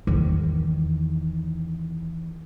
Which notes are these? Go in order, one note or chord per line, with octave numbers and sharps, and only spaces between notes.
E2 D#3